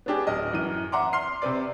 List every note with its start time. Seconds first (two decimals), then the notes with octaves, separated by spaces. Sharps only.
0.06 B3 C#4 D4 G4 G#4
0.27 D1 D#5
0.53 F#2 E3 D#7
0.92 E5 F#5 A#5 C6 D6
1.13 C6 F6 C7
1.42 C3 C4 B4 D5